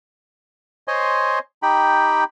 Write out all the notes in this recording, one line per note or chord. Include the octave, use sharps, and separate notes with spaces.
C5 C#5 D#5 G#5 C6
D#4 G4 G5 B5